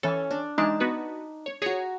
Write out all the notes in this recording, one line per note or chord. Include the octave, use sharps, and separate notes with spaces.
E3 C#4 A4
D4
E3 G#3 D4 D#4 A5
B3 F#4 B4
C#5
F#4 G#4 C#5 A#5